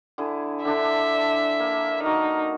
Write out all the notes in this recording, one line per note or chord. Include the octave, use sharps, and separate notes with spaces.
D3 E4 G#4
D3 D4 E5 C6
A#3
D#4 F#4 A#4